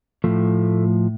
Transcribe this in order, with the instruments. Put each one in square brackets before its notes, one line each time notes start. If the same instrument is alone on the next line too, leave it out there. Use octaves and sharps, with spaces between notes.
[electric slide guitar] A2 F3 A3